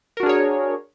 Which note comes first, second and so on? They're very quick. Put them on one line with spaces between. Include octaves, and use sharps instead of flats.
A#4 F#4 D4 G#4 C#5